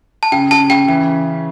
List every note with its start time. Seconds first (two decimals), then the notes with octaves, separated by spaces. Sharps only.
0.23 A5
0.32 C#3 G5
0.51 C#3 A5
0.70 C#3 G5
0.88 E3 G5